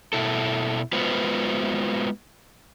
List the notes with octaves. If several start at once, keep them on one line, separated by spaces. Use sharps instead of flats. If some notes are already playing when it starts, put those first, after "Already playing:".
B2 E4 A4
G#3 B3 F4 F#4 B4 C5